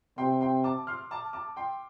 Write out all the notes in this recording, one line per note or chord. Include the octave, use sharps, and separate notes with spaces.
C3 G5 C6
G5 C6
A5 D6
C6 F6
A5 D6
A5 D6
G5 C6